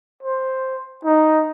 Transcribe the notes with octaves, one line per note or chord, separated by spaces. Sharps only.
C5
D#4